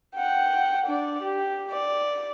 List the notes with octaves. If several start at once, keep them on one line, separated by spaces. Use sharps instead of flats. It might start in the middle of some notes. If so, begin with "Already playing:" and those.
F#5 G5
D4 D5
G4
D5